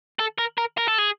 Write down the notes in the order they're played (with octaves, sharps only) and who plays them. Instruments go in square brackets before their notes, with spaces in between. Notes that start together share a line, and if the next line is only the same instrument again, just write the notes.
[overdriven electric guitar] A4
A#4
A#4
A#4
A4
G#4